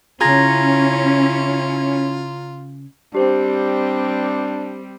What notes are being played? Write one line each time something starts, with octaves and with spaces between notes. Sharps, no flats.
C#3 C#4 E4 F4 G#4 A#5 G#6 A#6
G3 C4 D4 G4 C5